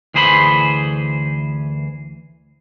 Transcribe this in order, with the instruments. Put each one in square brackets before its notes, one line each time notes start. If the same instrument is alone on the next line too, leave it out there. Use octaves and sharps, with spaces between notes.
[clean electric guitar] D2 E3 G#4 C5 D5 B5